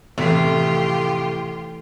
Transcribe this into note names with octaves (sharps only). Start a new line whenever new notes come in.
F1 A2 E3 A3 F4 G4 B6